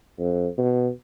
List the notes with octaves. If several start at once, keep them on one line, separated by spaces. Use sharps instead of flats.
F2
B2